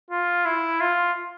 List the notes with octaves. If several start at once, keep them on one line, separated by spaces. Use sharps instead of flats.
F4
E4
F4